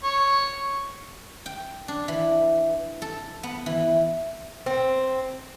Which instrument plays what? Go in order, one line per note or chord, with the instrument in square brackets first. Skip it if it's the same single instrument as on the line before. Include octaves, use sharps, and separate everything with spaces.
[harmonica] C#5
[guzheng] G5
D4
E3
A4
B3
E3
[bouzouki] C4